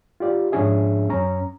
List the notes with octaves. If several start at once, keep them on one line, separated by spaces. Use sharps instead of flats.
F4 G4 D5
G#2 F3 C#4 D4 G#4 E5
F#2 C#4 A#5